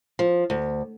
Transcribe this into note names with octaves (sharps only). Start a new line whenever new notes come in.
F3
D2